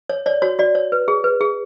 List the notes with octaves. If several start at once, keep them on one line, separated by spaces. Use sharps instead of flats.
C#5
C#5 D5
F#4 C#5
F#4 D5
C#5
B4
G#4
B4
G#4